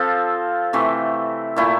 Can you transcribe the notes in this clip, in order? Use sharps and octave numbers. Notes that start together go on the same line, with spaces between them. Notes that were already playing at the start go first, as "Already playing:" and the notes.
Already playing: F3 C4 F4 A4
C3 E3 A3
A#2 A3 E4